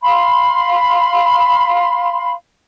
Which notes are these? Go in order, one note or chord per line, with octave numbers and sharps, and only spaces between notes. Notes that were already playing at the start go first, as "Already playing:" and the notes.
F5 B5 C6